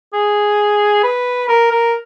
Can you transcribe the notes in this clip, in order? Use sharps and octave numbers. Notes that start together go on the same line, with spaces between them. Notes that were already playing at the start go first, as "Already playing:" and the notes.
G#4
B4
A#4
A#4